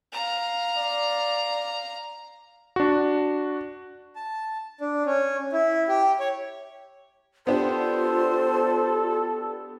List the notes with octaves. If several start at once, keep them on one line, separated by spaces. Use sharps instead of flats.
F5 A#5
D5
D4 F#4
A5
D4
C#4
E4
G4
C#5
B3 D4 F4 G4 A4 C5